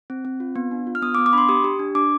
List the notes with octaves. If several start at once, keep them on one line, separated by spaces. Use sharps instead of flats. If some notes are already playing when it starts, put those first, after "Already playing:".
C4
C4
F4
B3
D4
F4
F6
B3 D#6
D6
B3
D6
D4 B5 C6
G4 D#6
G4
D4
D4 D6